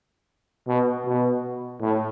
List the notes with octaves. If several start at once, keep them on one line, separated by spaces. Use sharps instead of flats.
B2
B2
A2